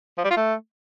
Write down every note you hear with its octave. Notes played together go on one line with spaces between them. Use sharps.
F3
G3
F4
A3